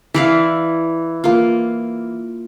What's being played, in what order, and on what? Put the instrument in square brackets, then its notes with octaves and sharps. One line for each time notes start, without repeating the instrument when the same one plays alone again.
[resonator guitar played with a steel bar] E3 [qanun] E4 D5 F5
[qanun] A#3 F4